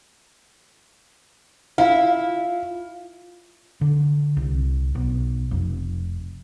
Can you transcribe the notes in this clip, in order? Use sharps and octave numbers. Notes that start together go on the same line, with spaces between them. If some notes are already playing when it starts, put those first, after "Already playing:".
E4 F4 F5
D3
C2
B1
F1